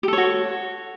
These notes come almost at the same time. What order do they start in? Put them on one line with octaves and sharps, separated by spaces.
G4 A4 C#5 F#4